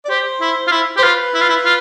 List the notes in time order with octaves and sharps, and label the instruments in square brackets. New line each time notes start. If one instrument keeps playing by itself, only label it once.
[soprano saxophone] D5
[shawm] G4 [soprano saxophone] C5
[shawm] E4
F4
E4
[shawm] G4 [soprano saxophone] C5
[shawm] F4 [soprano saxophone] B4
[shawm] E4
F4
E4
F4